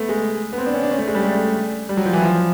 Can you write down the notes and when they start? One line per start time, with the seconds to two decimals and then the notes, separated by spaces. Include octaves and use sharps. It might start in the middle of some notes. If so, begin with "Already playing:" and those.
Already playing: A3 B3
0.09 G#3
0.53 B3
0.58 C4
0.66 D4
0.74 C#4
0.83 D4
0.91 C#4
0.98 A3
1.08 G#3
1.15 G3
1.24 A3
1.89 G3
1.97 F#3
2.06 F3
2.13 E3
2.22 F3